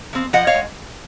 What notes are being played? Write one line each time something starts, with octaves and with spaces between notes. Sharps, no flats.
F3 C4
F3 D#5 F#5
C#5 F5
G#3